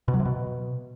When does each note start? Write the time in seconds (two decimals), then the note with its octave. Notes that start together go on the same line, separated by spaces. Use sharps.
0.08 B2
0.14 F#3
0.20 C3
0.25 B2